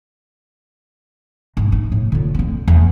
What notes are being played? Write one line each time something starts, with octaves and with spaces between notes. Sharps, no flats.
G#2
D#4
A2
D3 F4
D3 C4
E2